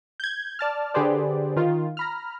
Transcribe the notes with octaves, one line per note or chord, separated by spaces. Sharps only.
G6 G#6
D5 A5 F6
D3 G4 G#4 B4 C5 D5
D#3 F4
A#5 B5 F6